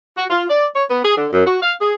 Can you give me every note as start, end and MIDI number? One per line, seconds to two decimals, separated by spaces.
0.17 0.25 66
0.30 0.44 65
0.50 0.65 74
0.75 0.84 73
0.90 1.04 59
1.05 1.16 68
1.17 1.27 50
1.33 1.45 42
1.46 1.57 66
1.62 1.74 77
1.81 1.94 68